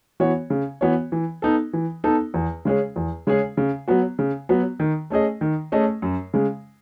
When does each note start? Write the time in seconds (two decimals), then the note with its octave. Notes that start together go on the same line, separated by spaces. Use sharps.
0.20 E3 B3 F#4 C#5
0.50 C#3
0.81 E3 B3 F#4 C#5
1.12 E3
1.42 B3 D#4 A4
1.73 E3
2.04 B3 D#4 A4
2.34 E2
2.65 C#3 G#3 C#4 G#4
2.96 E2
3.27 C#3 G#3 C#4 G#4
3.57 C#3
3.88 F#3 B3 F#4
4.19 C#3
4.49 F#3 B3 F#4
4.80 D#3
5.10 A3 C#4 G#4 D#5
5.41 D#3
5.72 A3 C#4 G#4 D#5
6.02 F#2
6.34 C#3 G#3